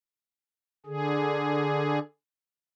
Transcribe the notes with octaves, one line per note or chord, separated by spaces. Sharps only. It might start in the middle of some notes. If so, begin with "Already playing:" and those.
D3 G#4